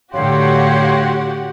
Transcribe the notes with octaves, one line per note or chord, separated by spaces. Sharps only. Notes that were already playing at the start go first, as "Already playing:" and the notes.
A2 D3 F#4 G4 C#5 F5 F#5 C6